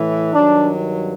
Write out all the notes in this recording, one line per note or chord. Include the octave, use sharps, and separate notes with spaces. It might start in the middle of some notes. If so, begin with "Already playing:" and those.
Already playing: A2 E3
G2 D#3 F#3 D4